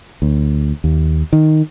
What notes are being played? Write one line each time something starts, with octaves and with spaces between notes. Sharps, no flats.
D2
D#2
D#3